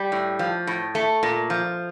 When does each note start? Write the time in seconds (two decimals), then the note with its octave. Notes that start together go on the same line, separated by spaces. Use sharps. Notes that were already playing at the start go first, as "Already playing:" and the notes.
Already playing: G3
0.12 A2
0.39 F3
0.67 A2
0.95 A3
1.23 A#2
1.50 F3